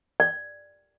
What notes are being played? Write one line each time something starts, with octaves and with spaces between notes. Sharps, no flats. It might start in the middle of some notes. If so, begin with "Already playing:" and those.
D5